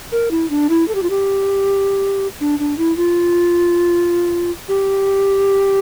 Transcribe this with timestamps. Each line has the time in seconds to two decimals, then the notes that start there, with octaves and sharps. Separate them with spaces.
0.12 A#4
0.31 E4
0.50 D4
0.69 E4
0.88 A4
0.95 G4
1.03 F4
1.10 G4
2.40 D4
2.59 D4
2.78 E4
2.97 F4
4.68 G4